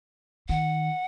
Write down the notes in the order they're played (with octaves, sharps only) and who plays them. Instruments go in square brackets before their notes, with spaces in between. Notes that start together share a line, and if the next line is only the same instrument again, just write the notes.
[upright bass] D#3 [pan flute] F#5